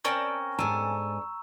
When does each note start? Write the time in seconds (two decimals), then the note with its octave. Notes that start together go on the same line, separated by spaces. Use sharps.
0.05 C4 C#4 A#4 D5 G5 A5 C#6
0.59 G#2 D4 A4 G#5 A#5 E6